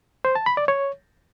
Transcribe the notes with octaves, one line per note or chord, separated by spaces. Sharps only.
C5
A5
B5
D5
C#5